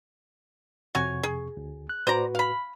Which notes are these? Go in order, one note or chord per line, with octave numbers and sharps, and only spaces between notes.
F2 C3 F#4 C#5 G#5 C#6
G#4
D2
F#6
A2 F#4 B4 C5 D5 A#5
F5 B5